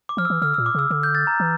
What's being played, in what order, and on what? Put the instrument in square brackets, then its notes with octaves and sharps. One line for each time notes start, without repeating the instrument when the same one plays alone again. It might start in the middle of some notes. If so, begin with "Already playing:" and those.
[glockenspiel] D6
[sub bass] F3 [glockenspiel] F6
[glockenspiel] E6
[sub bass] E3
[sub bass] D3 [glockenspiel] F6
[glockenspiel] E6
[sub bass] A#2
[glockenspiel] D6
[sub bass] C#3 [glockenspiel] E6
[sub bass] D3 [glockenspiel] E6
[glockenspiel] G6
A6
A#5
[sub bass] E3